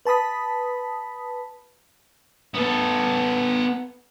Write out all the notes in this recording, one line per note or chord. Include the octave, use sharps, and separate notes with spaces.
B4 A5 B5 D#6 B6
B3 A4